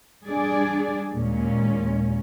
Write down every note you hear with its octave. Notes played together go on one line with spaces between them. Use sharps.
G3 D4 G#4 D5
D#2 A#2 G#3 C#4